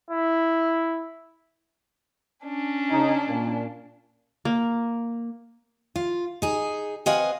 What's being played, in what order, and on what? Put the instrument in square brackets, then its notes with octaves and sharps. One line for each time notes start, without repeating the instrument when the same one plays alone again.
[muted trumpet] E4
[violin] C#4 D4
[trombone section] C#3 D#4
A#2
[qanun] A#3
[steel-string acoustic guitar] F4
D#4 G#4
C4 B4 D#5 F5 F#5 G#5